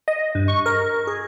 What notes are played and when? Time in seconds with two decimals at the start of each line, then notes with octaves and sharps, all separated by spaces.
0.08 D#5
0.35 G2
0.48 C#6
0.66 A#4
1.07 G#4